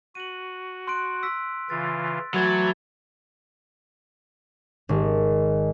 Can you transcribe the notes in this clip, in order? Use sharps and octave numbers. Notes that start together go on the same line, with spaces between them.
F#4 D#7 F#7
C6 F#6 D7
E6 B6
C#3 E3 F4 A6
E3 F#3 A3 B5 G#6 A6
G#1